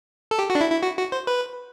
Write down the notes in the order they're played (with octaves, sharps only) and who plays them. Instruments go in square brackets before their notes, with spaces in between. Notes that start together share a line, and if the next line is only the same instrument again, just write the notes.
[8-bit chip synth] A4
G4
F#4
D4
E4
E4
F#4
F#4
C5
B4